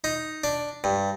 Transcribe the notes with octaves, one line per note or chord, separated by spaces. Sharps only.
D#4
D4
G2